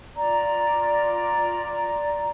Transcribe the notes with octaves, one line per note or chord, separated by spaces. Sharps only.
F4 D5 A#5